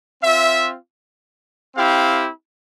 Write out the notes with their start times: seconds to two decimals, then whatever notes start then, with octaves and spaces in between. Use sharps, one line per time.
0.23 C4 F4 E5
1.76 C4 E4 G4 F5